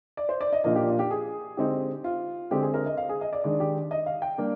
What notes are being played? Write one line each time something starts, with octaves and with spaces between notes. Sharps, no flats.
D5
C5
D5
D#5
A#2 F3 A#3 D4 D#5
G4
F4
G4
G#4
D3 G#3 C4 D#4 G4
F4
D3 G#3 C4 G4
G#4
A#4
D#5
F5
G#4
D#5
D5
D#3 G#3 D4 D5
G4
D#5
F5
G5
G3 A#3 D4